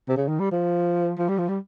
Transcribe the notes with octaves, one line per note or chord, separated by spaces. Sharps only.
C3
C#3
D#3
G3
F3
F3
G3
F3
G3